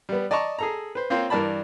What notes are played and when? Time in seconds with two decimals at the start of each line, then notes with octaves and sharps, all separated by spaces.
0.09 G3 B3
0.31 D5 D#5 A5 A#5 C#6
0.59 G#4 A4 A#5
0.95 B4 C5
1.10 A#3 C4 F4 C5 C#5
1.30 G2 E3 A#4 D5 A5 B5